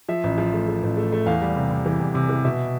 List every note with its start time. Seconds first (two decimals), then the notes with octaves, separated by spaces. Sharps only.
0.09 F3 E5
0.24 A1
0.38 F3
0.53 A3
0.68 A3
0.83 A1
0.97 A3
1.12 A3
1.26 E2 F5
1.41 G3
1.56 C3
1.71 C3
1.86 E3
2.00 E2
2.15 C3
2.29 E3
2.45 B2 E5